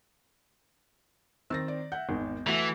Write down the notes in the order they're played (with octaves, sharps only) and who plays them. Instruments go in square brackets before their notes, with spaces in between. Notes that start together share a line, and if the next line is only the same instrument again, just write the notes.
[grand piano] D#3 C4 [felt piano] E6 A6 A#6
[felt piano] D5
[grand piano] E5 F#5 [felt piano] G6
[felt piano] G#1 D#3 [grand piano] E2
[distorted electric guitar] E3 [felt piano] A3 F#4